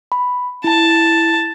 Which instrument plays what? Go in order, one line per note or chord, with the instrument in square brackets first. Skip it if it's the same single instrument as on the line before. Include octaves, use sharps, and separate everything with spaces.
[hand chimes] B5
[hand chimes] E4 [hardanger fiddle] A5